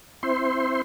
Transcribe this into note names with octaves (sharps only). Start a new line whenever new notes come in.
C4 E4 C5 C6